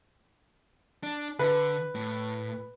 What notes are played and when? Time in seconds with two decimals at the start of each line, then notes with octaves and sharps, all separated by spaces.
1.03 D4
1.39 D3 B4
1.95 A2